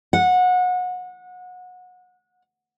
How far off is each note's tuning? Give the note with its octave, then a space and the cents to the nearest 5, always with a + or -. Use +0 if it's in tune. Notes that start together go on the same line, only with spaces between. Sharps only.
F#5 -25